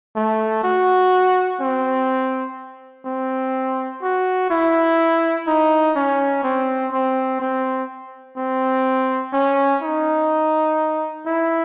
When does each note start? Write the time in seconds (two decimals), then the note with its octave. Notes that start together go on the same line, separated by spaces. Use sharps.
0.16 A3
0.63 F#4
1.60 C4
3.05 C4
4.02 F#4
4.50 E4
5.47 D#4
5.96 C#4
6.44 C4
6.92 C4
7.40 C4
8.37 C4
9.33 C#4
9.82 D#4
11.27 E4